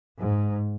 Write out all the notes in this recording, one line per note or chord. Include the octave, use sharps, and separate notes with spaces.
G#2